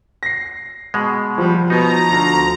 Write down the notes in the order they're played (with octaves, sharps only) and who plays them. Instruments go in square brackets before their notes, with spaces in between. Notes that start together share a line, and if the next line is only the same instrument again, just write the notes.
[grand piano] A#6 C7
[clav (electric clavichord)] B2 G#3
[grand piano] F3 [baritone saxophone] G3
[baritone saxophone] B2 [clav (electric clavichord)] D#4 [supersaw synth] A#5
[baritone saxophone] D2